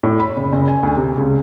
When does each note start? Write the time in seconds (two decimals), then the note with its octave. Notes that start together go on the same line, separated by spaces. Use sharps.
0.03 A2
0.20 B5
0.37 F#1
0.53 F#1
0.68 G#5
0.83 D2
0.96 C3
1.18 C#2